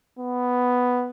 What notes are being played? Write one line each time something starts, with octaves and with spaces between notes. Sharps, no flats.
B3